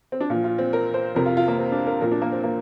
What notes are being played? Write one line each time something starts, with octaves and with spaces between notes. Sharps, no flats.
C4
D4
A#2 F3 F4
F4
C4
A#4
C5
F2 C3 F3 A#4
F4
F4
A#3
C4
D4
A#4
A#2 F3 A#4
D4
A#3
C4
A#3